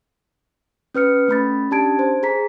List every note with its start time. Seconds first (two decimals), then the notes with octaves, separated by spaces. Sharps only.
0.95 C#4 B4 F6 C#7
1.28 A3 C#4 B5 A6
1.71 C#4 D4 G4 A5 G#6 D7
1.99 C5
2.23 G#4 A#5 B6